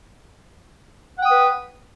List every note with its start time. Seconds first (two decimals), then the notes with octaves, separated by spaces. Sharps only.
1.19 F#5
1.22 G5
1.26 D#6
1.29 B4